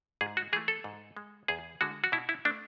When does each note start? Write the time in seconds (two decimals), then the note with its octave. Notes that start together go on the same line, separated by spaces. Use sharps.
0.21 G#2 G#4
0.37 F#4
0.53 E3 G#4
0.56 A3
0.68 A4
0.84 G#2
1.17 G#3
1.48 E2 G#4
1.81 D3 G#3 F#4
2.04 F#4
2.12 B2 E4
2.29 E4
2.45 A3 D4